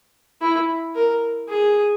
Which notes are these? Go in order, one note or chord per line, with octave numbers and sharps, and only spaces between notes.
E4
A#4
G#4